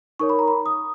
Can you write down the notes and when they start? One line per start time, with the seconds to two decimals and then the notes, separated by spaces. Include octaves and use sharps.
0.20 D#4 A#4 C#5 C#6
0.29 B5
0.39 A#5
0.48 B5
0.66 D#6